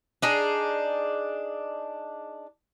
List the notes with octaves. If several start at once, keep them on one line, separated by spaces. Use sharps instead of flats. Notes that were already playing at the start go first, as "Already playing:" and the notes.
D4 D#4 G#4